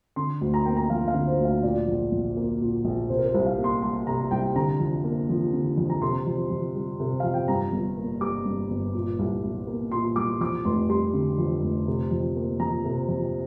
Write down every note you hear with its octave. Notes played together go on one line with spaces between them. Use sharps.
D3 C6
D2
A#5
A#3 G5
A#5
F3 F5
F5
D3
C5
D2
F5
A#2 D5
A#1
A#1
A#3
A#2
A#1
C3 C5
A#4
C5
C2
F5
A#3
C6
G3 C6
C3 A#5
C2 G5
D3 A#5
F2
A#3
F3
D3
F2
A#5
C3 C6
F2
F2
G3
C3
F2 F5
G5
G2 A#5
G1
A#3
G3 D6
G2
G1
A#2
C2
C2
A#3
A#2 C6
C2 D6
F2 D6
F1 C6
G3 C6
D3
F2
F1
C3
F2
A#3
F3 A#5
C3
F2